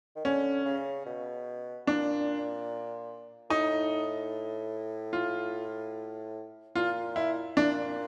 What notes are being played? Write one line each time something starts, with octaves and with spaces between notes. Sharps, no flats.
D#3
D3 C#4
C#3
B2
A#2 D4
A2 D#4
F4
A#2 F4
E4
A#2 D4